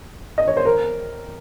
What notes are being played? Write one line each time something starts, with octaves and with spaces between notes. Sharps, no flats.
D#5
C#5
C5
A#4